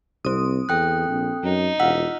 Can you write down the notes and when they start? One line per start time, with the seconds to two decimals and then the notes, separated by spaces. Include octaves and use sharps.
0.25 C2 C4 D#6
0.69 E2 A4 G5 F#6
1.08 A#1
1.43 F#2 D#4
1.80 E1 F4 F#5 E6 B6